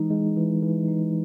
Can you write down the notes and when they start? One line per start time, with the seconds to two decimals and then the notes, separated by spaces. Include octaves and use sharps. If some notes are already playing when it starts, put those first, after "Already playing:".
Already playing: E3 G#3 D#4
0.10 G#3
0.37 E3
0.62 E3
0.88 D#4